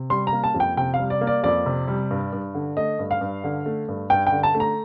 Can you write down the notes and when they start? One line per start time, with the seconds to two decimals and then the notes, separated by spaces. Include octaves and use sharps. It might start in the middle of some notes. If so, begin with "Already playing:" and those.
Already playing: C3
0.10 G3 C6
0.27 A#5
0.32 A#3
0.44 A5
0.55 F2
0.60 G5
0.77 C3 G5
0.94 F5
1.00 G3
1.10 D5
1.21 A#3
1.27 D5
1.44 F2 D5
1.66 C3
1.88 G3
2.11 G2
2.33 G2
2.55 D3
2.77 A3 D#5
2.99 G2
3.11 F5
3.21 G2
3.44 D3
3.66 A3
3.88 G2
4.10 G2 G5
4.27 G5
4.32 D3
4.43 A5
4.54 A3
4.60 A#5